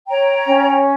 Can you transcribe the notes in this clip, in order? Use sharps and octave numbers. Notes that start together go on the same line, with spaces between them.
C#5 G5 A#5
C#4